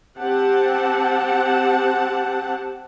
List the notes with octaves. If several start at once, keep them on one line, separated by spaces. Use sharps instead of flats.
C4 G4 F#5 A5